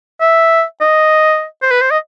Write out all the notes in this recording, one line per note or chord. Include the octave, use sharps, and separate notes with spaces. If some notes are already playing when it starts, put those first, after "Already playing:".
E5
D#5
C5
B4
C5
D#5